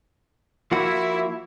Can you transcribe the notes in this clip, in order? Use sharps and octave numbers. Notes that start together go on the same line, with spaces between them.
F3 A#3 E4 F#4